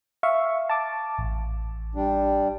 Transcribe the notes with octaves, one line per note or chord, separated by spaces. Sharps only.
E5 F5 C#6
A5 D6
A1
G3 D4